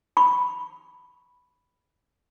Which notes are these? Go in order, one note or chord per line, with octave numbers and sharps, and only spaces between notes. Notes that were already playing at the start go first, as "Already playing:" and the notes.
B5 C#6